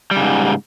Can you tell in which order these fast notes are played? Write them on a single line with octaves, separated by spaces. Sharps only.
G3 C#3 G#2